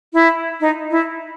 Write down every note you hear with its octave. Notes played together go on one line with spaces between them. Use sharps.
E4
D#4
E4